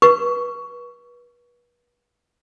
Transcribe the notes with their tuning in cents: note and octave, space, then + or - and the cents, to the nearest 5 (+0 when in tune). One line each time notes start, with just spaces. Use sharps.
B4 -35 C#6 +15